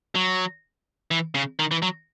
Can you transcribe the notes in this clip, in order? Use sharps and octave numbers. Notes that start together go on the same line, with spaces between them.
F#3
E3
C#3
D#3
E3
F#3